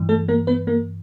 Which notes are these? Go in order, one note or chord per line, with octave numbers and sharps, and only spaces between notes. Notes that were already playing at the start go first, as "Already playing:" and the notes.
Already playing: G2 E3
A3 A4
A#3 A#4
B3 B4
A#3 A#4